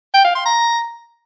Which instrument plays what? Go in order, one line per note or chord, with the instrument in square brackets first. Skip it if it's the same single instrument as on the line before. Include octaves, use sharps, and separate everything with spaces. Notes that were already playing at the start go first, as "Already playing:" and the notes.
[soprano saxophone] G5
F5
C6
A#5